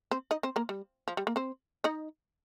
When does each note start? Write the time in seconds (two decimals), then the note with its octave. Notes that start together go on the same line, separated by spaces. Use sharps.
0.11 C4 C5
0.31 D#4 D#5
0.43 C4 C5
0.56 A#3 A#4
0.69 G3
1.08 F3
1.17 G3
1.27 A#3
1.36 C4 C5
1.84 D#4 D#5